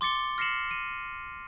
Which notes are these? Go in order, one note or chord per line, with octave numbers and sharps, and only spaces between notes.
C6 D6 A6 C#7 G7
F6 A#6 C7 C#7 E7 F#7
D#7